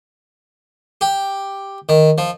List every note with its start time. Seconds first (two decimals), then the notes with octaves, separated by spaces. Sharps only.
1.01 G4
1.89 D#3
2.18 F3